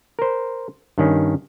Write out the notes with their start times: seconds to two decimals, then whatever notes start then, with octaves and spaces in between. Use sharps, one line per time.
0.19 A#4 C5
0.98 G2 D#3 C#4